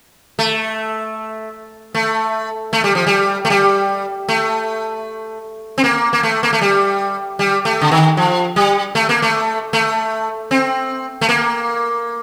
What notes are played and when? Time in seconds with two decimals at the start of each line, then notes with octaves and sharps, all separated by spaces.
0.39 A3
1.95 A3
2.73 A3
2.84 G3
2.95 F3
3.07 G3
3.45 A3
3.50 G3
4.29 A3
5.78 C4
5.84 A#3
6.13 A#3
6.23 A3
6.43 A#3
6.53 A3
6.61 G3
7.39 G3
7.65 A3
7.81 D3
7.91 D#3
8.17 F3
8.56 G3
8.95 A3
9.09 A#3
9.22 A3
9.73 A3
10.51 C4
11.21 A3
11.29 A#3